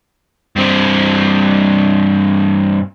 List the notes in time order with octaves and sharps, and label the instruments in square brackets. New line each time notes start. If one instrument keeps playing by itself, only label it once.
[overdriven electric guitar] G2 C4